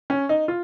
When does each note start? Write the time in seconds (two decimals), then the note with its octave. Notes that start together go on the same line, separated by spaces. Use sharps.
0.10 C#4
0.29 D#4
0.48 F4